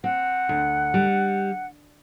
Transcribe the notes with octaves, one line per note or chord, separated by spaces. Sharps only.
C4 F#5
D2
G3